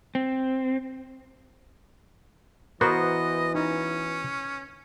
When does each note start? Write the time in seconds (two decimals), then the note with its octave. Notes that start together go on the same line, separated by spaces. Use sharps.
0.15 C4
2.81 E3 B3 F#4 A#4 C5 D#5
3.55 C#4 D#4